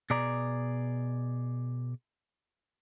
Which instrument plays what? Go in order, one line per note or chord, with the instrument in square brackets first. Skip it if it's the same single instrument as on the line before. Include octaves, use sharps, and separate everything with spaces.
[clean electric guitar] B2 G#4 D5 A#5